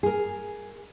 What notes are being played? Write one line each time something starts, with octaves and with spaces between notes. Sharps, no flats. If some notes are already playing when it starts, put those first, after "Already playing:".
G#4 A#4